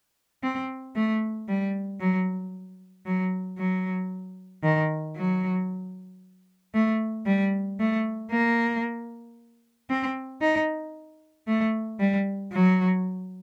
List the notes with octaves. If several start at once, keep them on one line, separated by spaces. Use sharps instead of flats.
C4
A3
G3
F#3
F#3
F#3
D#3
F#3
A3
G3
A3
A#3
C4
D#4
A3
G3
F#3